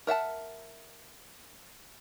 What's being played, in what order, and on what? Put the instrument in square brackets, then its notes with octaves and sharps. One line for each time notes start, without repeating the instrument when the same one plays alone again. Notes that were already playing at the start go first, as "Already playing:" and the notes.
[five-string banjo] A#4 E5 F#5 A5